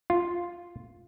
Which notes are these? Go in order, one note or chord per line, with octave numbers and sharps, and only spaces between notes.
F4